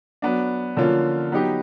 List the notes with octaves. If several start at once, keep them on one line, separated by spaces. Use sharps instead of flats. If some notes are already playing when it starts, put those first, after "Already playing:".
F#3 B3 D4
D3 F3 A#3 C#4 F4
F#3 B3 D#4 G4